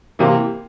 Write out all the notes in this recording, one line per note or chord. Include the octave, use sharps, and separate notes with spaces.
C3 E3 A#3